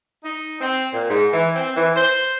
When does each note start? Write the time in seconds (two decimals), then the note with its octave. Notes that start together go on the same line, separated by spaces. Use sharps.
0.24 D#4
0.61 C4
0.93 A#2
1.08 G#2
1.33 E3
1.55 C4
1.76 E3
1.96 C5